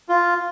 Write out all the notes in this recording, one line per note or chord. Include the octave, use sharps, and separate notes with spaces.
F4